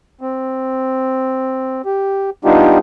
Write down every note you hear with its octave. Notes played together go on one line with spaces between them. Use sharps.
C4
G4
G3 B3 D4 D#4 F4 G4